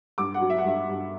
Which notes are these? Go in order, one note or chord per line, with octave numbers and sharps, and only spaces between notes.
G2 D6
F#5
F#3
E5
F#5
G2 E5
G2